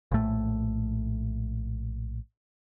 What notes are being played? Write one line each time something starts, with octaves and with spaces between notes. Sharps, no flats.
A#1 A2 A3